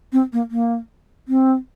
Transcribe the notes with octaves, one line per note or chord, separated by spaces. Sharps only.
C4
A#3
A#3
C4